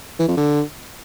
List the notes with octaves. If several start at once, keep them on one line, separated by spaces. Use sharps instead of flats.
E3
F2
D3